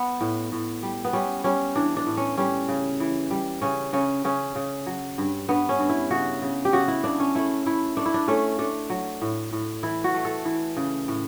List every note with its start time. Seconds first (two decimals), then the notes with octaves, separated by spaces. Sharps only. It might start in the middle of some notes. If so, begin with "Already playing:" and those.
Already playing: B3
0.21 A2
0.52 A2
0.83 G3
1.05 B3
1.13 G3 C#4
1.44 G3 C#4
1.76 E3 D4
1.97 D4
2.07 A2
2.17 C#4
2.37 G3 C#4
2.69 C#3
3.00 E3
3.31 G3
3.62 C#3 C#4
3.93 C#3 C#4
4.25 C#3 C#4
4.55 C#3
4.86 F#3
5.18 G2
5.49 G2 B3
5.69 C#4
5.80 G2
5.89 E4
6.10 C#3 F#4
6.42 C#3
6.65 G4
6.73 C#3 F#4
6.88 E4
7.04 C#3 D4
7.20 C#4
7.35 A3 E4
7.66 A3 E4
7.97 A3 D4
8.06 E4
8.14 D4
8.28 A3 C#4
8.59 A3 D4
8.90 F#3
9.22 A2
9.53 A2
9.83 E3 E4
10.04 F#4
10.14 A3
10.25 A4
10.45 E3
10.77 C#3
11.08 A2